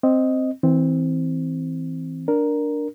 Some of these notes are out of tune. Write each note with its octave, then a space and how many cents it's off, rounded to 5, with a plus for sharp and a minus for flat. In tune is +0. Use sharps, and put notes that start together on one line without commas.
C4 +0 D#5 +0
E3 -25 C4 -5
D4 +0 A#4 +0